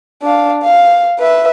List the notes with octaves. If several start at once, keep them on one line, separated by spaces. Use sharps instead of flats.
D4 F5
F5
B4 E5